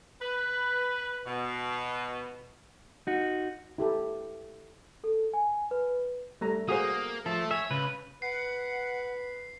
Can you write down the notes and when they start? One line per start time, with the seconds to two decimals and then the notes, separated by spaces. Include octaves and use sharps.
0.22 B4
1.26 B2
3.07 D#4 F#4
3.78 E4 G4 A4
5.04 A4
5.33 G#5
5.71 B4
6.41 G3 A3 A#5
6.69 A#3 F#4 G#4 C5 D#6
7.26 F3 A4 E5 A5
7.51 C#5 E5 G#5
7.71 C#2 B4
8.22 B4 F#5 C7